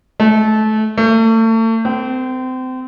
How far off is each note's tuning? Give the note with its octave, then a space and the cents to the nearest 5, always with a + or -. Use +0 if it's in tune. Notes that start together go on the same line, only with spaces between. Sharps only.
A3 -25
A3 +35
C4 -30